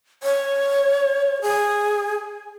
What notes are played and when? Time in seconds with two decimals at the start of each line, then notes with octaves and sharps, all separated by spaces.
0.23 C#5
1.42 G#4